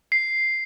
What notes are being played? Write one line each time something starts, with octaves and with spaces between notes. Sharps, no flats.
C7